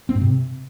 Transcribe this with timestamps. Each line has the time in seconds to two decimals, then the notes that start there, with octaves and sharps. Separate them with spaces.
0.09 C4
0.15 G#2
0.21 C3